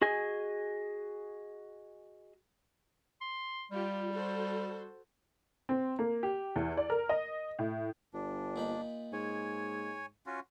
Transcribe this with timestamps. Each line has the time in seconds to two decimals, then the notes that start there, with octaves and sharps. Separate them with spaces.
0.02 F#4 G#4 D#5 G#5
3.21 C6
3.71 G3 F4 G4
4.11 F#4 A4 C5
5.69 C4
5.99 A#3
6.23 G4
6.56 E2
6.77 D5
6.90 A#4
7.09 D#5
7.59 A2
8.14 G1 D4
8.56 A#2 D#4 B5
9.13 G#2 C#5 G#5
10.26 C#4 F4 F#4